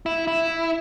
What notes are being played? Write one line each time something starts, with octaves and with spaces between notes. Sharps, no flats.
E4
E4